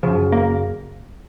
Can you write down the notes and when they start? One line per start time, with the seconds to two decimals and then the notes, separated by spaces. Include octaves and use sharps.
0.03 F#2 C#3 F3
0.32 A#3